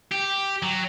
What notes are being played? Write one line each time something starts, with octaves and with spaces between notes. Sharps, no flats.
G4
F#3